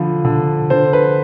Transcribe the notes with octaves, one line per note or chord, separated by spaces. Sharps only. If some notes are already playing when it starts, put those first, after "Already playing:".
Already playing: D3 F3 B5
D3
D3 C5
B4